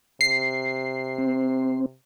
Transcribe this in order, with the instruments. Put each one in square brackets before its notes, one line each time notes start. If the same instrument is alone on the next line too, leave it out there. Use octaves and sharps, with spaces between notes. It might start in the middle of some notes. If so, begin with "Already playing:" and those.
[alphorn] C3 [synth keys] C7
[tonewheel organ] C4